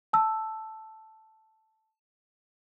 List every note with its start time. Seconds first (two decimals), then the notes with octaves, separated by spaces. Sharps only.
0.13 A5 E6